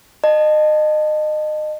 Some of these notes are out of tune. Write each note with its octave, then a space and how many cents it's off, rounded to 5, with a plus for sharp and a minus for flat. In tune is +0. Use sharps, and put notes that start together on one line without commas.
D#5 -30 A5 +0